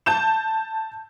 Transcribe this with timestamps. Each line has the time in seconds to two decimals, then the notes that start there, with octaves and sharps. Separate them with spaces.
0.06 A5 G6 E7